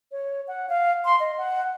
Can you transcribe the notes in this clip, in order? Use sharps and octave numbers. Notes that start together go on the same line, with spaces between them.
C#5
F#5
F5
C6
D#5
F#5